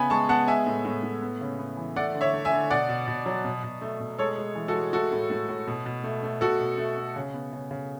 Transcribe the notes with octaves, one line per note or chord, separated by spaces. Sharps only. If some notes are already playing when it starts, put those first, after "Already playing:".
Already playing: C#3 B3 G#5 B5
G#3 A5 C#6
B3 F#5 A5
G#3 E5 G#5
A2
A2
A2
B3
C#3
B3
E3
A3 D5 F#5
D3
C#5 E5
A3
E5 G#5
D3
B2 D5 F#5
B2
B2
F#3
B2
B2
A3
B2
G#3 A4 C#5
G#3
E3
F#4 A4
G#3
A3 F#4 A4
A2
A2
A2
B2
B2
A3
A3
B2 F#4 A4
B2
A3
A3
C#3
B3
C#3
C#3